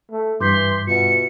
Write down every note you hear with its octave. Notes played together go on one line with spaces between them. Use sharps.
A3
G2 E3 C6 D6 G6 B6
B2 F4 E5 F#5 C#7